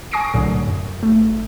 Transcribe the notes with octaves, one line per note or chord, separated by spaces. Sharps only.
G#5 C#6 D#6 A#6 C7 D7
C2 A2 D3 F#3
F#2
G#1 A3